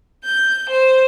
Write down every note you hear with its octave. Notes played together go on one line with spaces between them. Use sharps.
G6
C5